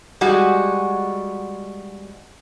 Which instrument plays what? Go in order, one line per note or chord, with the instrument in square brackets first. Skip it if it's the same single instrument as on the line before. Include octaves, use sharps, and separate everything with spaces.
[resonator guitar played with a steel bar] G3 G#3 F#4